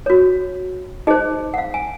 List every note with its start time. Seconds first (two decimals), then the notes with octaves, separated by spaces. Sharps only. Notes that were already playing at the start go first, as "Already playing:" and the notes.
0.06 F#4 C#5
1.07 D#4 G#4 C5 D#5
1.54 F#5
1.58 F5
1.74 G#5